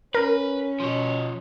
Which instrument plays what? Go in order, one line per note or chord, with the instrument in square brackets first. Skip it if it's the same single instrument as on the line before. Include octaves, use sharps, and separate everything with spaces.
[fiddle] C#4 [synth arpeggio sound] A#4 [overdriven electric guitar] B4
[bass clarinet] B2 [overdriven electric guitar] F3 C#5